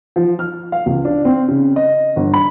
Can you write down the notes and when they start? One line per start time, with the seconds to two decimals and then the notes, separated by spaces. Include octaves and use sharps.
0.16 F3
0.39 F6
0.72 F5
0.86 C#2
1.05 D4
1.25 C4
1.48 C#3
1.76 D#5
2.16 G1
2.34 B5